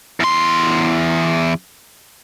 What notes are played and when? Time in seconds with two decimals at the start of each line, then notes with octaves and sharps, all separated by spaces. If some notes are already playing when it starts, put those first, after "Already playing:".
0.20 E2 C6